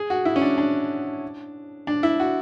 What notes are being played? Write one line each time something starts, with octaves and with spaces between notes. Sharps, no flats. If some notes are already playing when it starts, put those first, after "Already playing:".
Already playing: G#4
F#4
E4
C#4
D4
D4
D4
E4
F#4